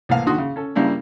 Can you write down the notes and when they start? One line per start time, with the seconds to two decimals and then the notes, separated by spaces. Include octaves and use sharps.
0.09 C2 A2 E3 A#3 F5
0.26 D#2 D3 D#3 F#4 C6 D#6
0.38 C#3
0.56 C#4 A4
0.76 G2 C#3 G3 A#3 D4 E4